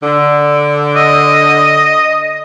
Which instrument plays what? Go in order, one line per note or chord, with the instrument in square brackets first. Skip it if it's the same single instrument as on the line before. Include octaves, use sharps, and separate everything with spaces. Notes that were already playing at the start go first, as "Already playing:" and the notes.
[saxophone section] D3
[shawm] D#5